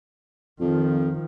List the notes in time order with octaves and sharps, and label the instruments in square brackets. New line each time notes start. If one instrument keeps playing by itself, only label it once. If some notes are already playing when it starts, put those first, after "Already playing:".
[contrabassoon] F2 [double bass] D#3 F3